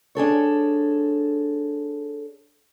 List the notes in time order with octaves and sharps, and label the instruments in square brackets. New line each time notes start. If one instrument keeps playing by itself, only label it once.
[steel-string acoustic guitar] D4 G#4 A4 C#5